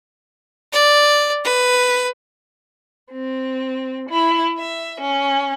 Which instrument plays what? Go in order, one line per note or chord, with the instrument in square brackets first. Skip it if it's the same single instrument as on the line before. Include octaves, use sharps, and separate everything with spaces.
[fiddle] D5
B4
[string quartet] C4
E4
E5
C#4